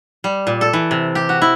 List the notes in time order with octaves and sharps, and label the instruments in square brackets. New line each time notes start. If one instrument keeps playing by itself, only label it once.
[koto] G3
A#2
A4
E3
C3
G4
F#4
E4